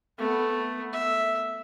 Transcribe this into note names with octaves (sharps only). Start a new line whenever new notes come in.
A3 B3
E5